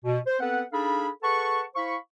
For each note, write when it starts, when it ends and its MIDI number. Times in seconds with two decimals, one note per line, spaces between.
0.04 0.19 47
0.27 0.36 72
0.40 0.62 59
0.40 0.62 60
0.40 0.62 69
0.40 0.62 71
0.40 0.62 78
0.72 1.08 62
0.72 1.08 63
0.72 1.08 68
0.72 1.08 69
0.72 1.08 77
0.72 1.08 83
1.23 1.62 68
1.23 1.62 69
1.23 1.62 71
1.23 1.62 78
1.23 1.62 81
1.23 1.62 85
1.75 1.96 64
1.75 1.96 72
1.75 1.96 77
1.75 1.96 83
1.75 1.96 85